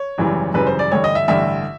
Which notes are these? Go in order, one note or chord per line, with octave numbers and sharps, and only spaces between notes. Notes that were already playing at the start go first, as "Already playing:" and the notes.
Already playing: C#5
G#1 F#2 C#3 E3 G3
G#1 F#2 C#3 E3 G3 B4
C5
D5
A1 G2 D3 C#5
D#5
E5
A1 G2 D3 E5